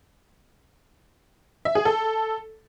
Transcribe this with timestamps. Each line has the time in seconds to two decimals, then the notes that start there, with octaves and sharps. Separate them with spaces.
1.65 E5
1.75 G#4
1.85 A4